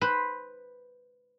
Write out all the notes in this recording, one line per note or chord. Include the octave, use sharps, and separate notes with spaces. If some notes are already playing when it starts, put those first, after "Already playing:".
B4 C5